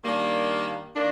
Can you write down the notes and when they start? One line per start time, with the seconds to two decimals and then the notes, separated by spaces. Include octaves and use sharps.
0.02 D#3 G3 A#3 D4
0.96 D#3 A#3 D4